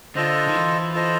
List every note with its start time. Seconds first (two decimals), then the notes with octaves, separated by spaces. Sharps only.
0.15 D3 F4 A4 C5 D#5
0.48 D#3
0.55 E3
0.93 F4 A4 C5 D#5